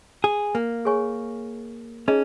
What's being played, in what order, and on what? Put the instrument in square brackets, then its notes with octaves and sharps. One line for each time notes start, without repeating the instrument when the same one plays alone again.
[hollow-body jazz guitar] G#4
A#3
[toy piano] G#4 C#5 G#5 C#6
[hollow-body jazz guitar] C#4 [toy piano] D#4 G#4 D#5 A#5